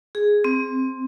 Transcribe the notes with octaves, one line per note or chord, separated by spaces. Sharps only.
G#4
C4